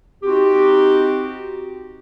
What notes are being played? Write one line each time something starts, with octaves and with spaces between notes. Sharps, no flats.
C4 D#4 F#4 G4